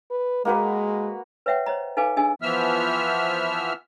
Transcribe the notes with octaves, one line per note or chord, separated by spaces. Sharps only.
B4
G#3 A#3 F#4 B4
B4 C#5 E5 F#5 G5
C5 C#5 D#5 A#5
D#4 A4 B4 F5 G#5 D6
D4 G#4 D#5 G#5 E6
E3 F3 B3 E5 E6 F6